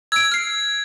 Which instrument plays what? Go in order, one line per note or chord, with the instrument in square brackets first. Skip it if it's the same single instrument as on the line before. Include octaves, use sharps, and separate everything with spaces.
[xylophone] E6 D7 [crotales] G#6
[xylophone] F6 C7